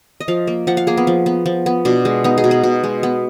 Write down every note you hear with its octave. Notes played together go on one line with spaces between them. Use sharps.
D#5
F3 F5
A#3
F3 F#5
F5
A#3 G#4
B3
F3
B3
F3
B3
B2 D4
G#3
B3 D#4
G#4
B2
B4
B2
G#3
B3